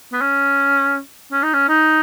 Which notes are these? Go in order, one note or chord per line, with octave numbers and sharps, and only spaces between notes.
B3
C#4
C#4
D#4
C#4
D#4